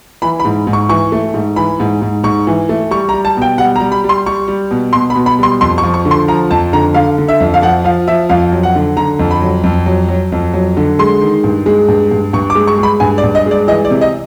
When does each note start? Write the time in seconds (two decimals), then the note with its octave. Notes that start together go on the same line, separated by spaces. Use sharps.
0.22 E3 B5
0.40 B5
0.45 G#2
0.67 G#2
0.73 C#6
0.89 E3 C#6
1.12 A3
1.34 G#2
1.56 E3 B5
1.80 G#2
2.02 G#2
2.23 G#2 C#6
2.47 E3
2.69 A3
2.91 G3 C#6
3.09 A#5
3.13 G3
3.25 A5
3.37 B2 G5
3.58 G3 F#5
3.76 A#5
3.80 G3
3.92 B5
4.04 G3
4.09 C6
4.26 G3 C#6
4.48 G3
4.71 B2
4.93 B2 C6
5.10 B5
5.15 B2
5.26 B5
5.39 G3 C6
5.61 F2 C6
5.78 C#6
5.83 F3
5.94 C#6
6.05 D3
6.11 C6
6.28 F3 A#5
6.51 F2 A5
6.73 D3 A#5
6.94 D3 F5
7.18 D3
7.28 E5
7.40 F2
7.54 F5
7.62 F3 F#5
7.84 F3 F5
8.08 F3 E5
8.29 F2 F5
8.52 F#3
8.63 F#5
8.75 D3
8.97 D3 A#5
9.19 F2
9.31 B5
9.41 F#3
9.64 F2
9.86 F#3
10.08 F#3
10.32 F2
10.53 F#3
10.77 D3
10.99 G#3 C6
11.21 D#3
11.44 G2
11.66 G#3
11.88 G2
12.11 G2
12.33 G2 C#6
12.50 D6
12.55 G#3
12.67 C#6
12.78 G#3
12.83 B5
13.00 G2 G#5
13.18 D5
13.23 G2
13.35 D#5
13.46 G#3 D5
13.68 E3 D#5
13.85 D5
13.90 C3
14.01 D#5